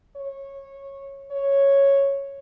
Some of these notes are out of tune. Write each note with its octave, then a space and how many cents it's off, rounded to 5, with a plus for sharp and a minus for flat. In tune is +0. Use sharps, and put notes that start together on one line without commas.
C#5 -15
C#5 -5